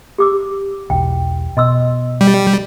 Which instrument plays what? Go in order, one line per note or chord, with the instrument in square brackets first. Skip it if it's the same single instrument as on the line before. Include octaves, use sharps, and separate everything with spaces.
[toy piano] G4 D6 E6
[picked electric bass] B1 E2 [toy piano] G5
[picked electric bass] B2 [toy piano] D#5 C6 E6
[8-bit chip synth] G3